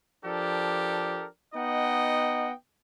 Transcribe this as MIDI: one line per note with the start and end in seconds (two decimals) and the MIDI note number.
0.25 1.26 53
0.25 1.26 62
0.25 1.26 67
0.25 1.26 69
0.25 1.26 70
1.54 2.51 59
1.54 2.51 63
1.54 2.51 75
1.54 2.51 78
1.54 2.51 79